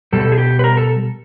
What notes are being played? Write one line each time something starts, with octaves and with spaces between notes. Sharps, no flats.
B2 G3 A4
G#4
G4
B4
A#4
A4